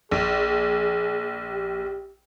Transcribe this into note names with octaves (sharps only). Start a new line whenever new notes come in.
A#1 G#4
G4